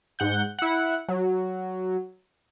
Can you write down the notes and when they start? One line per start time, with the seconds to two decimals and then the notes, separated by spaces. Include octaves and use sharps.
0.19 G#2 F#5 G6
0.59 E4 F#5
1.08 F#3